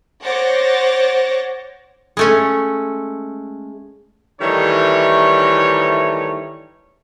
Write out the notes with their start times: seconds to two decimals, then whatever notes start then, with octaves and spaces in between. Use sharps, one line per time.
0.23 C5 C#5 F#5 D6 A6 A#6
2.17 G#3 A3 C#4
4.41 D#3 E3 G3 A3 D#4 C#5